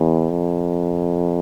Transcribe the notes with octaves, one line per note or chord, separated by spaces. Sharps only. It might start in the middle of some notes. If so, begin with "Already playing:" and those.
Already playing: E2
F2